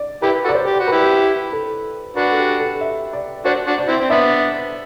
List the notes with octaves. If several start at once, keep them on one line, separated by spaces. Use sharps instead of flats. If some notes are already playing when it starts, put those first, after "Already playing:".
Already playing: D5
E4 G4 B4
F#4 A4
D5
C5
G4
F#4
E4 G4 B4
A4
D4 F#4 B4
A4
G4
A4
E5
D5
D4 F#4 C5
D4 F#4
D5
C4 E4
C4
B3 D4 E5